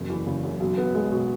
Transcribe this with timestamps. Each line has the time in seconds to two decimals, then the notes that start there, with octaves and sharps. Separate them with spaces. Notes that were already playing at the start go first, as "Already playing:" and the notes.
Already playing: F#1 E2
0.10 E3
0.27 C#3
0.43 F#2
0.60 B1
0.78 B3
0.95 G#3
1.12 B2